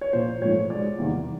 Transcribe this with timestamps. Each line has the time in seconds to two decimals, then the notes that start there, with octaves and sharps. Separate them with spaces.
0.01 C#5
0.13 A#1 A#2 F3 C5
0.42 A#1 G#2 F3 A3 C#5
0.70 B1 B2 G#3 D5
0.98 E2 C3 D#3 G3 A#3